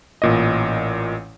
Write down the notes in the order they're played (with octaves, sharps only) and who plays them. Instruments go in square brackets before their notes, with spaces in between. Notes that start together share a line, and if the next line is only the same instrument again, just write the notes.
[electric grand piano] A1 A#2 D#5